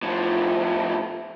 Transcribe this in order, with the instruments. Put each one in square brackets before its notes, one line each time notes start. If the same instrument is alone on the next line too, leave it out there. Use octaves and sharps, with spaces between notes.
[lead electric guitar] A2 F3